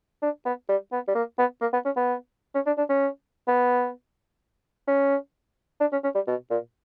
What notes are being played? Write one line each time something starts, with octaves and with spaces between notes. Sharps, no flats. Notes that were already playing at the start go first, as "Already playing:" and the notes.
D4
B3
G3
B3
G3
A#3
B3
A#3
B3
C#4
B3
C#4
D4
D4
C#4
B3
C#4
D4
C#4
C#4
G3
B2
A#2